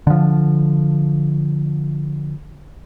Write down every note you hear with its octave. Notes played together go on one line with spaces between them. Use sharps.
D3 F3